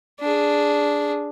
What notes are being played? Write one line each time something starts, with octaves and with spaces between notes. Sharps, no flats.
D4 G#4